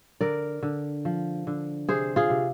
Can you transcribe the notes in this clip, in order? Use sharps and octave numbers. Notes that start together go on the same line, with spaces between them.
D3 A#4 D5
D3
F3
D3
C3 G#4 C5
F4 G#4
C3